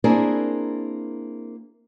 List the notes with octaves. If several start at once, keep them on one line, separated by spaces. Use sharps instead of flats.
A#3 C4 D4 E4 G#4 A#4